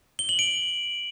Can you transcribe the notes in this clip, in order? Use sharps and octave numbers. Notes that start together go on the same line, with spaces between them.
G7
F#7
D7